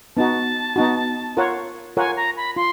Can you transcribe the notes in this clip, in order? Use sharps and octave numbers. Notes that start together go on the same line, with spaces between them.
B3 D#4 F#4 A5
B3 D#4 F#4
F4 A#4 C#5 F#5
F4 A#4 C#5 F#5 G#5
A#5
B5
F4 C6